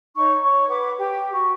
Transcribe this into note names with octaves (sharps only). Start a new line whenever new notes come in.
D#4 C#5 C#6
C#5 C#6
B4 F#5 D6
G4 G5
F#4 C#6